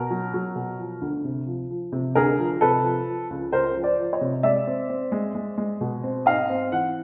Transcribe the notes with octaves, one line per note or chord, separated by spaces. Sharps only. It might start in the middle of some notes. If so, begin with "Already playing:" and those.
Already playing: B2 A#4
F#3
F#3
B2
F3
D2
C3
F3
F3
C3
D2 G#4 A#4
F3
C3 A4 B4
F3
F3
C#2
C#2 A#4 C5
F3
C5 D5
F3
C#5 D#5
C3
G#3 D5 E5
C4
C4
G#3
G#3
G#3
B2
C4
G#2 D#5 F5
C4
E3 F#5